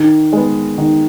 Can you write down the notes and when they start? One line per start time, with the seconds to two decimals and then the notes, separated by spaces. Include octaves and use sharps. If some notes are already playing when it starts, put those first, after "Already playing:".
Already playing: D#3
0.33 G#3 B3
0.78 D#3